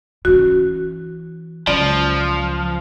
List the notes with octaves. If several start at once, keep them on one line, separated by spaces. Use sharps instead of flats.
E3 C#4 F#4
C#2 F3 F#3 D5